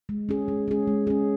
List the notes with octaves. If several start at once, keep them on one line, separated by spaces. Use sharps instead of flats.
G#3
C#4 G#4
G#3
C#4 G#4
G#3
C#4 G#4